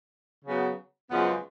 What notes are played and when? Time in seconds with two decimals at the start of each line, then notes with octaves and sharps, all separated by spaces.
0.45 C#3 F#3 B3
1.10 F#2 C#3 F3 G#3 B3